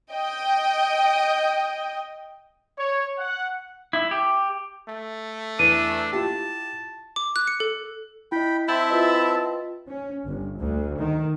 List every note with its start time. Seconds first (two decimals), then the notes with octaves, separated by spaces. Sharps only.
0.12 D#5 G5
2.79 C#5
3.18 F#5
3.93 E4
4.11 G4
4.89 A3
5.59 E2 D4 D#7
6.12 E4 F4 G4 A5
7.16 D6
7.36 F#6
7.47 C#7
7.60 A4
8.32 E4 D#5 G5 B5
8.68 C4 E4 E5 A5 G6
8.90 F4 B4 D#5
9.87 C#4
10.26 G1
10.58 D2
10.98 D#3